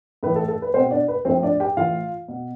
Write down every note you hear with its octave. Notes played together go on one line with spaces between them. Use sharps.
A2 E3 B4
A4
A4
B4
B2 C4 C5
D4 D5
B4
A2 F3 C4 C5
D4 D5
G4 G5
A2 E3 F4 F5
B2